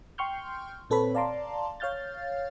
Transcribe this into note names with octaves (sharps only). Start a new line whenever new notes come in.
G5 C6 C#6 F6 G6
A#2 C4 A4 B4 C#5 B5
D5 F5 A5 A#5 C6 D6
C#5 F5 F6 G6 A6